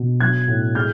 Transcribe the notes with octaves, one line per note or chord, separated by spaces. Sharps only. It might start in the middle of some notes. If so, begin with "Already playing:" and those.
Already playing: B2
F#3 F#6 G#6
A2
G#3 F6 G6